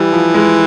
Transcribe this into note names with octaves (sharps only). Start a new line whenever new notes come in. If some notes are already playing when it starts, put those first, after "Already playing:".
Already playing: E3 G3
F3
G#3